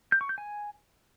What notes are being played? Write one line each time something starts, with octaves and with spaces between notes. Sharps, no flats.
G6
C#6
G6
G#5